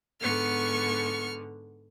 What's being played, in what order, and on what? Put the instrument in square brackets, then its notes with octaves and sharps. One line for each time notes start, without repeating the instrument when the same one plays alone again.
[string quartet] G#2 D3 [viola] B3 C#6 [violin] F6 C#7